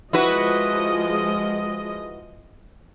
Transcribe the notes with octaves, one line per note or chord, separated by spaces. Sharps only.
F3 G#3 E4 F#4 B4 D#5